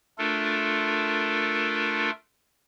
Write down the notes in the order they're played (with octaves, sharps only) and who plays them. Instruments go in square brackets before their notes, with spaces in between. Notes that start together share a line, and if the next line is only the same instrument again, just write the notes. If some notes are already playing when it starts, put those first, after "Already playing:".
[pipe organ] A3 D4 F4 A4 A#4